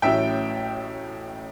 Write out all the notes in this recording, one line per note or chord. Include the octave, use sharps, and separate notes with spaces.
A1 A2 F#3 C#4 E4 E5 G5